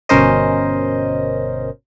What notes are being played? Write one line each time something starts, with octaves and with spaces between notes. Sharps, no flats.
G1 B2 C#4 A#4 C5 D#5